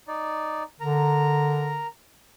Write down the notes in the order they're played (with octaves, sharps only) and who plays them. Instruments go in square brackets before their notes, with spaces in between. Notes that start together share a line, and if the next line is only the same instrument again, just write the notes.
[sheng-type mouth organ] D#4 D5
[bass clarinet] D3 [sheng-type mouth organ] A#4 A#5